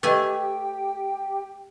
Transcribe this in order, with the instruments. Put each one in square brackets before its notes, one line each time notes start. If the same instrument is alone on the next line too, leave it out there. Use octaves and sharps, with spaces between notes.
[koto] A3 G#5 [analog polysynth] G4 [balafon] B4 D#5 [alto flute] G5